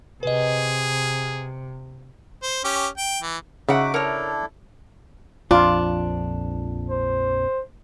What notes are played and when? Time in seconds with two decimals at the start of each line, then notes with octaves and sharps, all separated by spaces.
0.23 C3 G#4 B4 D#5
2.43 C5
2.64 C#4 G4
2.98 G5
3.22 E3
3.69 C#3 D#4 F#4 E5 F#5 D6
3.94 D4 E4 A4 A#4 C#5
5.51 A#1 F2 F3 D4 F4
6.90 C5